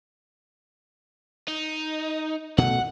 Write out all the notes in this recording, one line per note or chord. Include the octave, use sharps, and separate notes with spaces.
D#4
B2 A3 F#5